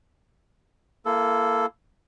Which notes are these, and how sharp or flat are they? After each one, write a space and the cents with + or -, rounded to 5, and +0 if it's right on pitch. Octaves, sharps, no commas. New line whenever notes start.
A#3 +0 E4 +35 A4 +0